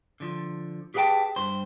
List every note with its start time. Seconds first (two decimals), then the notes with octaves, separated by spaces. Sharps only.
0.20 D3 F3
0.94 G4 G#4 B4 F5 G5 A5
1.36 G2 C5